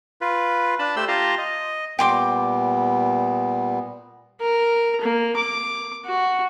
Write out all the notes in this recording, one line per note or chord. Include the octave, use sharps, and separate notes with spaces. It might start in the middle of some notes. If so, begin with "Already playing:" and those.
F4 B4
D4 A5 B5
A3 G4 C5 C6 E6
F4 G4 A5 A#5 C6
D#5
A#2 G3 B3 G5 C6 D6
A#4
A#3
D6
F#4